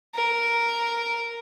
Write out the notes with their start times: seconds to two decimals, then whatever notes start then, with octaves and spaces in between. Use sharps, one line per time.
0.15 A#4